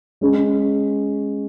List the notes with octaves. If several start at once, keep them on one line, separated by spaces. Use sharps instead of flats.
G#3 C#4 G#4